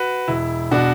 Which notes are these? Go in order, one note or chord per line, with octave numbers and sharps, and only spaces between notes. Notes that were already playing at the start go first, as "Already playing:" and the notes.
Already playing: F#4 B4
E1 E4
B2 D4 F#4